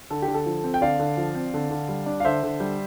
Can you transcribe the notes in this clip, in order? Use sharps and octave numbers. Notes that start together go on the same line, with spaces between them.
D3 A4
G4
D3
A4
F3
C4
G5
D3 D5 F5
D3
F3
C4
D3
D3
G3
D4
F5
D3 C5 E5
D3
G3